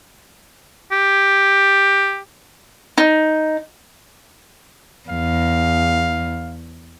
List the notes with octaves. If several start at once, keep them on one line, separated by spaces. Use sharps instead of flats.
G4
D#4
E2 F5